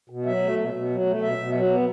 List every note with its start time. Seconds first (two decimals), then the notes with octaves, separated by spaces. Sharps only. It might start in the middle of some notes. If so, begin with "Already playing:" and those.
0.10 B2
0.25 F#3 E5
0.42 A3
0.58 B2
0.74 B2
0.90 F#3
1.06 A3
1.22 B2 E5
1.38 B2
1.54 F#3
1.70 B3